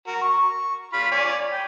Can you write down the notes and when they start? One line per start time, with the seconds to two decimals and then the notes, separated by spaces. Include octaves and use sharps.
0.07 F#4 A#4
0.21 C#6
0.93 F4 B5 F6
1.11 C#5 D5 G#5
1.52 G5